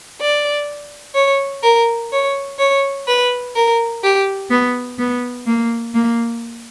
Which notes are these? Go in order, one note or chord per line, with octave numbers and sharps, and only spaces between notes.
D5
C#5
A#4
C#5
C#5
B4
A#4
G4
B3
B3
A#3
A#3